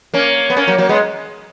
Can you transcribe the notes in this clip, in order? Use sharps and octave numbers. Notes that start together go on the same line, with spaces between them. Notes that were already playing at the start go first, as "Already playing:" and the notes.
A#3 C#4
B3
A#3 C#4
F#3 A#3
F#3 A#3
G#3 B3